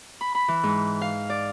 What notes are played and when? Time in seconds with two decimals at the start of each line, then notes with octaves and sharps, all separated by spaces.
0.21 B5
0.35 B5
0.48 E3
0.64 G#2
1.01 F5
1.30 D5